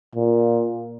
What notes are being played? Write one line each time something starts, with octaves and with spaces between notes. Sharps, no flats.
A#2